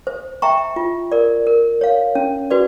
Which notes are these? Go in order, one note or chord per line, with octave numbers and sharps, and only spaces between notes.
C5
E5 G5 A#5 C#6
F4
A#4 D5
A#4
C#5 F5
C#4
F#4 B4 D5